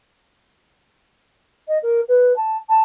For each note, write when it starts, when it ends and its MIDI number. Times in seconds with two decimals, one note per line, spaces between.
1.68 1.78 75
1.83 2.01 70
2.08 2.33 71
2.37 2.57 81
2.69 2.83 81